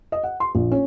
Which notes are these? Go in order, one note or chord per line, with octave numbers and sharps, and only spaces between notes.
D#5
F#5
C6
A#1
C#4